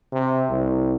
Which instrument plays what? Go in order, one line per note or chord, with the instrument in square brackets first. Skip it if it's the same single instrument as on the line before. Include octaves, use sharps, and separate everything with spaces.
[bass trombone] C3
C2